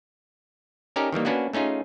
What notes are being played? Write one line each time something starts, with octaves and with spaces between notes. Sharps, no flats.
C#4 D#4 G4 A4 A#4 D5
D#3 E3 G3 A#3
A#3 B3 C#4 D4 F#4 B4
A3 C#4 D#4 F4 G#4